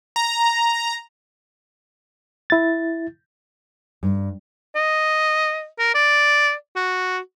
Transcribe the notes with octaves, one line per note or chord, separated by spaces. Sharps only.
A#5
E4 A6
G2
D#5
A#4
D5
F#4